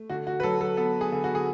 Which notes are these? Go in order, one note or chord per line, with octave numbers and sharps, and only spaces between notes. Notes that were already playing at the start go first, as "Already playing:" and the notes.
Already playing: A3
D3 F#4
F#4
B4
F#3 A4
A4
B3 A4
G#4
D3
F#4
G#4